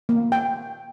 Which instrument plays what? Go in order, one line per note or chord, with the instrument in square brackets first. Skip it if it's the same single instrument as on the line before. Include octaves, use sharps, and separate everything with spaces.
[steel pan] A#3
G5